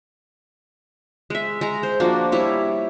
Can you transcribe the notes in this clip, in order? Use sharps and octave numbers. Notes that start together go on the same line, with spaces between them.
G#3 E5
G#3 A#5
C5
F3 A#3 D4 F#4
G3 E4 C#5